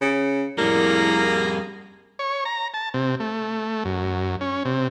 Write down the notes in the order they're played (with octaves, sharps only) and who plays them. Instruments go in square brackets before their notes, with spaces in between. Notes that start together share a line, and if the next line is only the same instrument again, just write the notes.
[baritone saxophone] C#3
[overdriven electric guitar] F2 G3 [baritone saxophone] A2 [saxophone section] A#3 G#4 A#4
[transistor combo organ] C#5
A#5
A5
C3
A3
F#2
C#4
C3